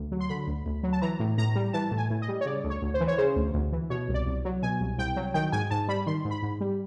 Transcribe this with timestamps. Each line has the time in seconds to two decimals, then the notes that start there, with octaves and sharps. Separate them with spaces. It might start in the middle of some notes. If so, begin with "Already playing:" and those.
Already playing: D2
0.12 F#3
0.21 C6
0.29 D3 B5
0.48 D2
0.66 D2
0.83 F#3
0.93 A5
1.02 E3 A#5
1.20 A2
1.38 A2 A#5
1.56 G3
1.73 E3 A5
1.91 A2
1.98 G#5
2.10 A2
2.22 D#5
2.28 G3
2.41 C#5
2.46 C#3 D5
2.64 D2
2.70 C#5
2.82 D2
2.94 C5
3.00 E3
3.08 C#5
3.18 C#3 C5
3.36 D2
3.54 D2
3.72 E3
3.90 B2 C#5
4.09 C2
4.14 D5
4.26 C2
4.45 F#3
4.63 B2 G#5
4.80 C2
4.98 C2 G5
5.16 F#3
5.34 D#3 G5
5.52 G#2 G#5
5.71 G#2 A5
5.88 G3 B5
6.07 D#3 C6
6.25 G#2
6.31 B5
6.43 G#2
6.61 G3